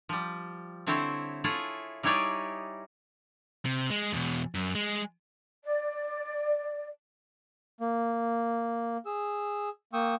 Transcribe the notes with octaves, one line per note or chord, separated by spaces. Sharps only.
F3 G3
D3 C4 E4 C5 C#5
E4 F4 G#4 A4 C#5
G3 D#4 E4 G#4 C#5 D5
C3
G#3
E2 B2
F#2
G#3
D5
A#3
G#4 E6
A#3 G5 C#6 D#6 E6